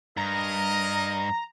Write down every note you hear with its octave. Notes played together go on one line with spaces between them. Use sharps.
G2 A#4 D#5 A#5